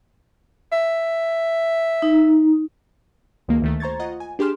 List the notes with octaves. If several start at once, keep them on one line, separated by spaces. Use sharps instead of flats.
E5
D#4
C#2 D#3 A#3 F#4
D2 D#3 A3
C5 A#5 C#6 G#6 A6
F4 D#5 F#5 A#5
G#5
D4 G4 G#4 C6 F6 E7